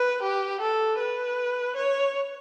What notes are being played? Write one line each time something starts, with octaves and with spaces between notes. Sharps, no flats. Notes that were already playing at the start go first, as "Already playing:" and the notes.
Already playing: B4
G4
A4
B4
C#5